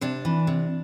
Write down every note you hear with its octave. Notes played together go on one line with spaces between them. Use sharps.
C3 D4
E3
C3